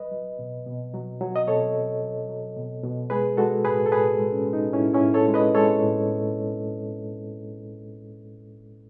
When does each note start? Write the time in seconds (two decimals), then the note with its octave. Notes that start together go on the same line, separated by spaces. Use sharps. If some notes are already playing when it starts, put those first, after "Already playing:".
Already playing: F#3 B4 D#5
0.12 F#3
0.39 B2
0.67 B2
0.94 F#3
1.21 F#3
1.36 D#5
1.47 B2 A4 C#5
1.75 B2
2.02 F#3
2.29 F#3
2.57 B2
2.83 B2
3.10 G#3 G#4 B4
3.37 G#3 F#4 A4
3.65 A2 G#4 B4
3.86 A4
3.92 A2 G#4 B4
4.19 G#3
4.32 C#4
4.47 G#3
4.53 D#4
4.73 A2 C#4 E4
4.94 C#4 E4
5.01 A2
5.14 A4 C#5
5.28 G#3
5.34 B4 D#5
5.55 G#3 A4 C#5
5.83 A2
6.09 A2